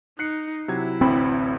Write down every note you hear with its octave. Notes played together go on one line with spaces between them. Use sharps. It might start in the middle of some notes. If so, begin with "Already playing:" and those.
D#4 F#6 C7 C#7
C3 F#3 E4 G#6
A1 D2 C4 B5